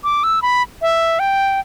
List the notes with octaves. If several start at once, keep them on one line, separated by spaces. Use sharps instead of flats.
D6
E6
B5
E5
G5